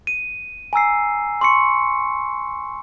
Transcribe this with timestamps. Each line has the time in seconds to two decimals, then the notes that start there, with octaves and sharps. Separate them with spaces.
0.07 D#7
0.73 G#5 A#5 E6 C7
1.41 C6 C#6 C#7